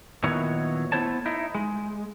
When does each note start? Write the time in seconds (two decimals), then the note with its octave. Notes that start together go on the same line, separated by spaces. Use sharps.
0.23 A#2 D#3 F#3 B3 E4 C#5
0.92 A3 B3 E4 C5 C#5 A5
1.26 D#4 E4
1.55 G#3